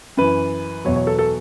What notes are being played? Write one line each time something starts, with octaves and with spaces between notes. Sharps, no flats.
F#2 E3 B4
E2 B2 F#3 C#5
C#5
A4
A4